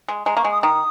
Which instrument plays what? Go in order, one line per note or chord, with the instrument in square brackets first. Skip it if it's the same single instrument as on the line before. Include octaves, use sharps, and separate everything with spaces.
[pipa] G#3
[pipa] G#3 [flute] A#5
[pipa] A#3 [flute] C#6
[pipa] G#3
[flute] D#6
[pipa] D#3 [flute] D#6